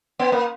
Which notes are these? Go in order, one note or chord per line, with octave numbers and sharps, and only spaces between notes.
B3
A#3